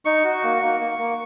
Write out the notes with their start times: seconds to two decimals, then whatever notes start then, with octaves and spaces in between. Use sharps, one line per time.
0.05 D#4 C#6
0.24 F#4
0.43 A#3
0.62 A#3
0.80 A#3
0.99 A#3